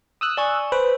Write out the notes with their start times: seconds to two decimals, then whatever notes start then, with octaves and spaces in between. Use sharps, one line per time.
0.21 D#6 E6 F#6
0.37 D5 G#5 C#6
0.72 B4 C5